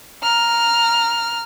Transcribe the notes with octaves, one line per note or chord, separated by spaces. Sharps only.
A#5 F6